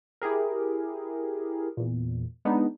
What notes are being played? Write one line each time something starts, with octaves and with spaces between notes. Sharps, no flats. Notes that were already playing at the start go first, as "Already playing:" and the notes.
E4 G4 G#4 A#4
E2 A#2
G#3 B3 D4 D#4